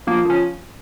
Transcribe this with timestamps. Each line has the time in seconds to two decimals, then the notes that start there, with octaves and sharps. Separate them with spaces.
0.07 F3 A#3
0.25 F3 C#4